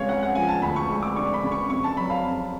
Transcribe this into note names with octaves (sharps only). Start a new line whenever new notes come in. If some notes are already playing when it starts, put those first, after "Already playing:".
Already playing: C#3 G#3 C#5 F5
C#4 F#5
F#5
F3 G#5
A5
D2 B5
C#6
G#3
D6
D4 C#6
B5
C#3
C#6
F2 C#6
A5
F#3 B5
F5
F2